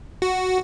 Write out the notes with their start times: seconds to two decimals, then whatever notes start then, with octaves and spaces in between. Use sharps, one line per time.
0.22 F#4